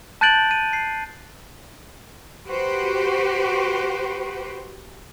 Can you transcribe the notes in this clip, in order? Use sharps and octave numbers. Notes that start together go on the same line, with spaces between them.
A5 F#6 G6 A6 D7 F#7
D#7
C7
F#4 G4 B4 C5